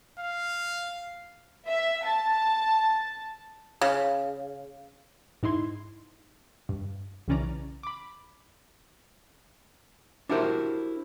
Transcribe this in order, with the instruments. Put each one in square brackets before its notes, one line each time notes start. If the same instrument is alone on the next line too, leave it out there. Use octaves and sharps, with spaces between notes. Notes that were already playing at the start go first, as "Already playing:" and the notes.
[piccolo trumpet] F5
[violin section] E5
A5
[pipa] C#3
[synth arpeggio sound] G#2 D#4 E4 C6 G#6
G2
B1 C#3 E3 C#4 D5 A#5
B5 D6
[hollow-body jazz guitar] D4 E4 F#4 G4 A#4 C5